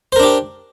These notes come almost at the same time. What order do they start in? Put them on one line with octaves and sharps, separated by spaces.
C5 A#4 D4 G4